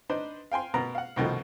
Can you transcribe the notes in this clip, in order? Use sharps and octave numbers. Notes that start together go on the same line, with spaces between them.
D4 D#4 B4 C5
F5 G5 G#5 C6
B2 B3 A#4 A#5
F5 F#5
C2 B2 D#3 F3 A3